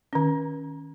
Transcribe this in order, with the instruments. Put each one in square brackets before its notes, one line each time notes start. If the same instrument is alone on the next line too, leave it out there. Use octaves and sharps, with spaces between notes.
[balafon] D#3 C#4